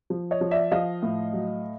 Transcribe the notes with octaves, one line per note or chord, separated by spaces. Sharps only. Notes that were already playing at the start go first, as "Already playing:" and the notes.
F3
C#5 D#5
F3
D5 E5
F3 D#5 F5
A2
F#3